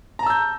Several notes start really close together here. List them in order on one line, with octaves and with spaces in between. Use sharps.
A#5 A5 E6 G6